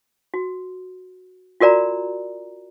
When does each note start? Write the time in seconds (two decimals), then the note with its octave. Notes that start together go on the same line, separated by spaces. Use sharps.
0.34 F#4
1.60 F4 F#4 A#4 D5 A#5